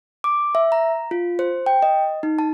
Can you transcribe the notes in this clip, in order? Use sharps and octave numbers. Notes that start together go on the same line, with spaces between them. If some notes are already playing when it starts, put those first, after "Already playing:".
D6
E5
A#5
F4
C5
G5
D#5
D#4
A5